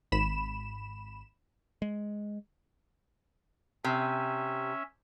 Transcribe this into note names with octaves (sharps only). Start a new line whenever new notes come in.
G#1 B5 E7
G#3
C3 C#4 E5